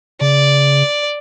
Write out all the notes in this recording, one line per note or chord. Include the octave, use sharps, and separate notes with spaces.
C#3 D5